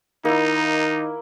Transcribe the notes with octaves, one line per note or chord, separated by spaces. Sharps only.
D#3 A#3 D#4 E4